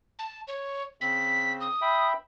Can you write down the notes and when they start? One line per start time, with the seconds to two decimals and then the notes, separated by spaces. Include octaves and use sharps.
0.19 A5
0.47 C#5
1.01 C#3 C4 B6
1.61 D#6
1.82 E5 G5 B5